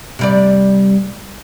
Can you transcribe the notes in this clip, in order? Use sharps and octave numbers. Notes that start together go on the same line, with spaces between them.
C3 G3 D5